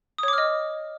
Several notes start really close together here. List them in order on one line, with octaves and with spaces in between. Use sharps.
D#6 C#5 D6 F6 D#5